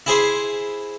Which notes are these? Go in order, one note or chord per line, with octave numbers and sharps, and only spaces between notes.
E4 G#4 C5